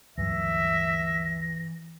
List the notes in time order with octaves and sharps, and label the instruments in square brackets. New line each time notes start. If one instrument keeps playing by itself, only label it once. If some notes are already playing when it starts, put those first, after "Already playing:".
[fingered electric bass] D2 G2 F#3 [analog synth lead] E3 [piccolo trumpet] E5 [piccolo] A#6